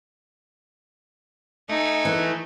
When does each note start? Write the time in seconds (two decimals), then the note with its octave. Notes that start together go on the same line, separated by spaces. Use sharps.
1.69 D#4 A4 E5 G#5
2.05 E3